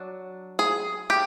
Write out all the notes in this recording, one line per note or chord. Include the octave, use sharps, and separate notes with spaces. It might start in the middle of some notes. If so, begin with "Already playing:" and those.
Already playing: F#3 D4
G#4
G4